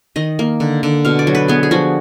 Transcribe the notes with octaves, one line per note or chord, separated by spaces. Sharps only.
D#3 D#5
A#3
D3
D3
B2 F5
D5
F#3
B4
B3 G#4
G#4
F3 F#4